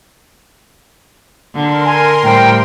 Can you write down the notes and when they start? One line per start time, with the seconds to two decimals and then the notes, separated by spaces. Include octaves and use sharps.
1.55 D3 A#4 C6
1.85 G#5
2.23 A2 G3 C5 G5